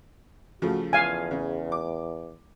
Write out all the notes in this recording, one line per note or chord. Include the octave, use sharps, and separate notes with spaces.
C#3 F3 A3 F#4
E2 F5 G#5
C#3
D6